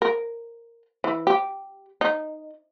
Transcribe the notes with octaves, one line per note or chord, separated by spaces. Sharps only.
A#4
E3
G4
D#4